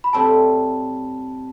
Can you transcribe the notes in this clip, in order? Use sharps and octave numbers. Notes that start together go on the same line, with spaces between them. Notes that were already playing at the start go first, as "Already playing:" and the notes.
B5
A2 G3 C4 E4 A5